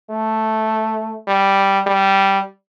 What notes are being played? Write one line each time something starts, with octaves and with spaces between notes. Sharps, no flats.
A3
G3
G3